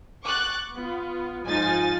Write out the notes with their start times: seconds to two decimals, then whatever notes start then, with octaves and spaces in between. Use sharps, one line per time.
0.25 C#6 D6 F#6 A6
0.73 B3 F4
1.44 G#2 F3 D#4 F4 G#5 A6